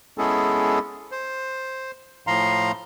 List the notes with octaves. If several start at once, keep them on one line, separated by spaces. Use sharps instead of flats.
G#3 B3 C#4 E4 G#4 A4
C5
A2 F3 F5 A#5 C6